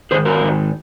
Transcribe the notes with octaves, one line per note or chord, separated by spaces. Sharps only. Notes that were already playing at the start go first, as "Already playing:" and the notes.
G#2 D#3 G#4 C5
F#4 A#4
G#2 D#3